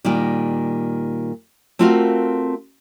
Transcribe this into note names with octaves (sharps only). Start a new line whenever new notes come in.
A#2 D#3 G3
A3 C4 F4 F#4 A#4 F5